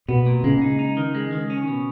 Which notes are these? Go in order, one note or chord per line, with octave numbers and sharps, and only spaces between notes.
B2 B3
A#2
C#3 G#3
D#4
D#4
D#3
G#3
D#3
C#4
B2